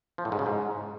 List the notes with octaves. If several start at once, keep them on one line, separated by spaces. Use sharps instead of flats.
F3
A2
G#2
C#3
G#2